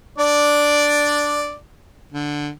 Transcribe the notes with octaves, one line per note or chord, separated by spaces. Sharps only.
D4 D5
D3